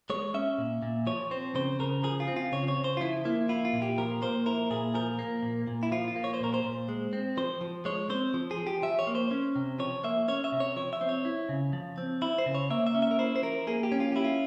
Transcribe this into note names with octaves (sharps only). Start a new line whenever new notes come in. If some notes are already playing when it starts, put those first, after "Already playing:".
G#3 C#5
C#4 E5
A#2
A#2
F3 C#5
C4 C5
C#3 C5
C#3 A#4
F3 G#4
F4
C4
F4
C#3 C#5
C#5
C#3
C5
F4
F3 E4
A#3 E4
E4 F4
F4
A#2
G4
F3 A#4
A#3 C5
E4 A#4
A#2 G#4
F3 A#4
A#3
A#2
A#2
E4
F3 F4
F4
A#3
C#5
C5
A#2 A#4
C5
A#2
G#3
C4
F3 C5
F3
G#3 C#5
C4 C5
F3
G#4
F3
G4
F3 E5
C#5
A#3
C5
C#4
C3
F3 C#5
A#3 E5
C#4 C#5
E5
C3
C#5
F3 C#5
E5
C4
C#5
E4
C#3
F3
C4
E4
C5
C#3
C#5
A#3 E5
E5
C#4
E5
A#4
E4 C5
C5
F3 A#4
A#3 G#4
G4
C#4
F4
E4 G4
F4